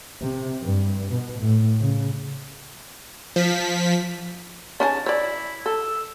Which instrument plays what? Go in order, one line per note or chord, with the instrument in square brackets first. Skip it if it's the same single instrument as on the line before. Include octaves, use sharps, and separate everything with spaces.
[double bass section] C3
G2
B2
A2
C#3
[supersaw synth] F3 B6
[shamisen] C#4 D#4 G#4 [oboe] A5
[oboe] E4 [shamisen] C#5 D5
[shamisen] A4 [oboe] E6